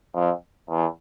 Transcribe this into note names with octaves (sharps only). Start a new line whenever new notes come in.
F2
E2